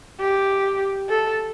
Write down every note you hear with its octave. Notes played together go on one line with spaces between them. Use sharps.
G4
A4